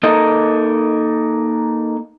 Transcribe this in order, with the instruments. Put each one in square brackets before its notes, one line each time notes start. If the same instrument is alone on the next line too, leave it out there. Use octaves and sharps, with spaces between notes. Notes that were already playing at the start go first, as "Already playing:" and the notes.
[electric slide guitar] A#3 D#4 A4 A#4 D#5